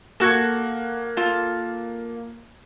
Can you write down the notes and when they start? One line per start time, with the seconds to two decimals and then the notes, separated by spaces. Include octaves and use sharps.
0.20 A#3 F#4 A4 F#6 G#6
1.17 F4 A4